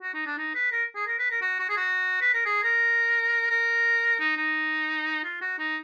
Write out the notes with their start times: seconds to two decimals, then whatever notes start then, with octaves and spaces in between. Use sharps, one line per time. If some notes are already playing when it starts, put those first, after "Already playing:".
0.02 F#4
0.14 D#4
0.26 D4
0.38 D#4
0.55 B4
0.72 A#4
0.95 G#4
1.07 A#4
1.19 B4
1.30 A#4
1.42 F#4
1.59 F#4
1.70 G#4
1.77 F#4
2.21 B4
2.34 A#4
2.46 G#4
2.63 A#4
3.50 A#4
4.20 D#4
4.37 D#4
5.24 F4
5.41 F#4
5.59 D#4